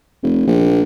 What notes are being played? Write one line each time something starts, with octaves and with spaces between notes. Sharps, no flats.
F1
A#1